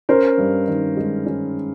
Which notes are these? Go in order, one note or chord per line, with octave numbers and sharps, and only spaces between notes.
C#4 A#4 C5
G2
D#3
G#3
C#4